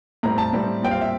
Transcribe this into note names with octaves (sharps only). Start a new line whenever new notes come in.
A2 G3 C4 A#5
A5
A2 G3 C4
A#2 G3 C4 G5
F5
E5